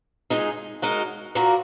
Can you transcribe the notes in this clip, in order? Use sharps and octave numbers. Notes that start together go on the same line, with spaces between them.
A#2 G#3 D#4 G#4
G#3 D#4 F#4 A#4
A#2 A#3 F#4 A#4